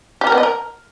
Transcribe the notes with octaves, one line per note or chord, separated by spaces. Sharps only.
G4
A#4
B3
D#5
A#4